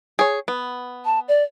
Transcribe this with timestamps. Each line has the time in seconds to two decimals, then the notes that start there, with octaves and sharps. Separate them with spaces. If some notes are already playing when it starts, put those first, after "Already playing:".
0.19 G#4 C#5
0.48 B3
1.05 A5
1.28 D5